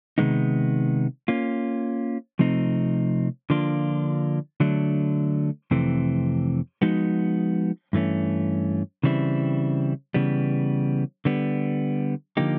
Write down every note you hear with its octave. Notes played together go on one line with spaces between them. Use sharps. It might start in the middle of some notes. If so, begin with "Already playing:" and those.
C3 D#3 G#3 B3 D#4
A#3 C#4 F4
C3 F3 A3 C4 D#4
D3 F3 A#3 D4 F4
D3 F#3 A3 D4
F2 C3 E3 A3 C4
F3 G#3 B3 D#4 F#4
G2 E3 A3 C#4
C#3 E3 G3 C4 E4
C#3 E3 G3 B3
D3 G3 B3
D3 F3 A#3 D#4 G4